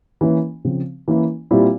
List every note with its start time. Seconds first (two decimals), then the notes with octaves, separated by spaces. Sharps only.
0.21 E3 A#3 C#4 E4
0.65 C#3 F3 C4
1.08 E3 A#3 C#4 E4
1.51 A#2 G3 C4 E4